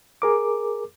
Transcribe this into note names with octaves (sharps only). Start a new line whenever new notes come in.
G#4 A#4 D6